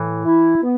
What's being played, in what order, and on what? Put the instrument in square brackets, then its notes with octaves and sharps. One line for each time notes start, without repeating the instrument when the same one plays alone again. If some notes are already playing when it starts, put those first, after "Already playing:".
Already playing: [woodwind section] A2 [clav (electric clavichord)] E3
[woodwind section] E4
B3